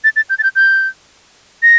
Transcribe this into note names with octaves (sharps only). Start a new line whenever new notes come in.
A6
A6
G6
A6
G6
G6
A#6